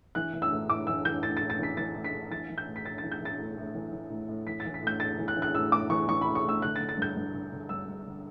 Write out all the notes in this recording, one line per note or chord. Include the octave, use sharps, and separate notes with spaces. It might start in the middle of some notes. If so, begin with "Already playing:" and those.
E3 F#6
E3
E6
A2
A2 D6
E3 E6
E3 G6
A2 A6
A6
A2
A6
E3 B6
E3 A6
A2
B6
A2
E3 A6
E3
G6
A2
B6
A2 A6
A6
E3
G6
E3 A6
A2
A2
E3
E3
A2
A2
E3 B6
A6
E3
B6
A2 G6
A2 A6
E3
F#6
E3
F#6
A2 E6
A2 D6
E3 C#6
E3 C#6
B5
A2
C#6
A2 E6
D3 F#6
A6
D3
A6
G2 G6
G2
D3
D3
G2 E6
G2
D3